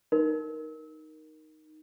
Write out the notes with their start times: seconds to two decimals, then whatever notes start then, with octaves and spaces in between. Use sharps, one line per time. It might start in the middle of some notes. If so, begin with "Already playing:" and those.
0.12 D#4 A#4